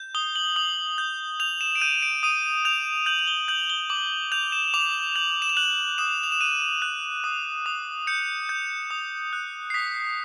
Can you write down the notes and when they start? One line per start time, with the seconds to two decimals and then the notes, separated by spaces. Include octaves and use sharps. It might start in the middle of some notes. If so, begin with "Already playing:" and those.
Already playing: G6
0.15 D#6 G7
0.36 F#7
0.56 D#6 F#7
0.98 G6
1.40 G6 F7
1.61 E7
1.75 D7
1.81 G6 D#7
2.02 D7
2.23 D#6 D#7
2.65 G6 F7
3.06 G6 F#7
3.19 F#7
3.28 G7
3.48 G6 F#7
3.70 G7
3.90 D6 F#7
4.32 G6 F7
4.52 E7
4.74 D6 F7
5.15 G6 F#7
5.42 E7
5.49 F7
5.57 F#6 F#7
5.98 D#6 E7
6.23 F7
6.32 E7
6.40 F#6 D#7
6.82 F#6
7.24 D#6
7.66 D#6
8.07 G6 C#7
8.49 G6
8.91 D#6
9.33 F#6
9.70 C7
9.74 D#6 B6